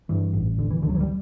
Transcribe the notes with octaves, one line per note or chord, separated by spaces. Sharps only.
G2 E3
A1
E1 D3
E3
D2 D3
F#3
E3
G3